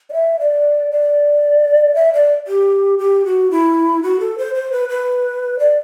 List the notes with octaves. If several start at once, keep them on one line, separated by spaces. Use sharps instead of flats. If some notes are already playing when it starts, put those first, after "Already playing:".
D5
E5
D5
D5
E5
D5
G4
G4
F#4
E4
F#4
A4
C5
C5
B4
B4
D5